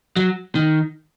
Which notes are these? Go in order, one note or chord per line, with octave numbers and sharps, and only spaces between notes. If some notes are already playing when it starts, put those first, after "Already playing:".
F#3
D#3